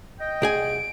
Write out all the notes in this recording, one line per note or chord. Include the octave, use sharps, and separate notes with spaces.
D#5 G5
C2 G#4 G#5 D7